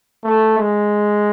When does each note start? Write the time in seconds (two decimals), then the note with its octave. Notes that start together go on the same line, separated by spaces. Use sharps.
0.24 A3
0.58 G#3